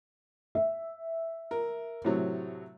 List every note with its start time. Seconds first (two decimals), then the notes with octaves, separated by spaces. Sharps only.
0.55 E5
1.51 A#4
2.05 A2 C3 F#3